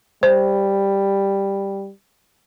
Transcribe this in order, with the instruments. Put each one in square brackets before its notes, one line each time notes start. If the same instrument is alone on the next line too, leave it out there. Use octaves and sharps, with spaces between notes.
[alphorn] G3 [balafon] C5